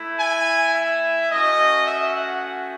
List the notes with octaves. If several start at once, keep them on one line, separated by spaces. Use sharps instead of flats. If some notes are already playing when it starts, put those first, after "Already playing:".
Already playing: A3 E4
G#5
E5
A3 C#4 F#4 D#5
E5
F#5